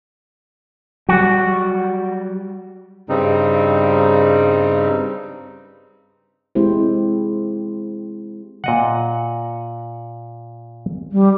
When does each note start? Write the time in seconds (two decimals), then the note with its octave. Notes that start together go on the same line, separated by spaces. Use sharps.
1.09 F#3 G3 F#4
3.09 G2 C#3 G3 C4 D#4
6.55 G#3 C4 E4 G4 C5
8.64 A#2 D#5 F#5
11.12 G3